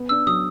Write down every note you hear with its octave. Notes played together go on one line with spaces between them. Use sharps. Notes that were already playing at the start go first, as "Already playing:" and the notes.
Already playing: B3
D4 E6
F#3 D#6